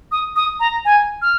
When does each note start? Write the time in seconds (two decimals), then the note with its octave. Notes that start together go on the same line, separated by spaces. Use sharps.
0.12 D#6
0.36 D#6
0.60 A#5
0.85 G#5
1.22 F6